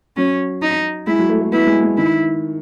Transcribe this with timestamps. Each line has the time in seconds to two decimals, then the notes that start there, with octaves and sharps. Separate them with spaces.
0.17 F#3 C#4
0.62 D#4
1.07 G#3 E4
1.19 F#3
1.29 A3
1.41 A3
1.52 B3 E4
1.67 G#3
1.82 G#3
1.97 D#3 E4